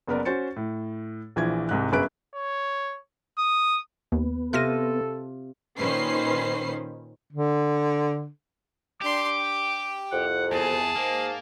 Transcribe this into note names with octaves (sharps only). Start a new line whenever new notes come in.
F#1 B3 A#4 D5
C#4 F#4 C5 A6 C#7
A2
A#1 E3 F3 G#6
C2 G#2 F#6
G1 F#2 G#4 B4 F#6 D7
C#5
D#6
D#2 B3
C3 F4 A4 F6 A#6 D#7
A#2 D#3 C#4 B4 C5 C7
D3
D4 G4 C6 D6
G5
C2 F2 F#5
E2 G#4 A5
G#2 A#3